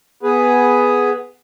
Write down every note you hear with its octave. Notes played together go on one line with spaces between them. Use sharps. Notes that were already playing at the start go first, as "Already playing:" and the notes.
B3 G#4 B4